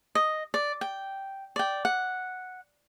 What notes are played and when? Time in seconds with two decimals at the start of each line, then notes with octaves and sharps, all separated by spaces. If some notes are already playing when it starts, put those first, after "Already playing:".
0.15 D#5
0.54 D5
0.81 G5
1.56 D5 G5
1.85 F#5